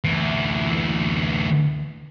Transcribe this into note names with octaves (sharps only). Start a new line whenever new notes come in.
D2 E3